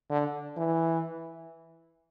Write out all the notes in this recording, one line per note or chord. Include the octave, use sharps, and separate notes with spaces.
D3
E3